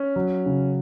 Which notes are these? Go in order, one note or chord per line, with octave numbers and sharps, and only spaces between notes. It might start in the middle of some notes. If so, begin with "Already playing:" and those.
Already playing: C#4
F#3
C#3